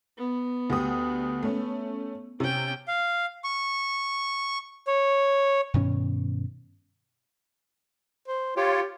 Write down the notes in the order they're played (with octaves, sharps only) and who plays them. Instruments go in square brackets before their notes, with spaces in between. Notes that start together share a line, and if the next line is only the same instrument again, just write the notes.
[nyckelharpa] B3
[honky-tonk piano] D2 G4 D#6
A3 C#4
[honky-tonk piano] C3 [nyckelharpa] C#4 G5
[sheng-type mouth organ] F5
C#6
C#5
[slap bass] G2 B2 D#3 C#4
[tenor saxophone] C5
[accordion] F4 C#5 [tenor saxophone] G4